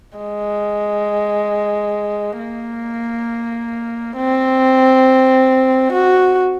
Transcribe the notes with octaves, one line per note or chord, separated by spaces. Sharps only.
G#3
A#3
C4
F#4